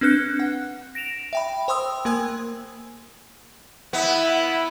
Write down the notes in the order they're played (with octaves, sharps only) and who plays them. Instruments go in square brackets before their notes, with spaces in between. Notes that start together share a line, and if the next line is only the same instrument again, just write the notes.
[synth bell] C4 D4 B4 F#6 C#7
F#5
A#6 D7 E7 F7
E5 G5 B5
C5 G5 C6 D#6 E6
A#3 A#4 G#5 E6 G#6
[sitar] B3 [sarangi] E4